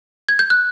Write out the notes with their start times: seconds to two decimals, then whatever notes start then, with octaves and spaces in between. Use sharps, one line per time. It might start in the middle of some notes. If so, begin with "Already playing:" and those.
0.29 G#6
0.39 G6
0.50 F#6